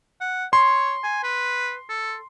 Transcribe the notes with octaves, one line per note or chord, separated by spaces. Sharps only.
F#5
C#5 C6
G#5
B4
A4